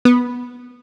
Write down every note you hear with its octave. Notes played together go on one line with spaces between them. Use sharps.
B3